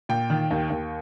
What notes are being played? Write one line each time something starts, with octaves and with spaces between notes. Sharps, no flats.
A#2 G5
D#3
D#2
D#2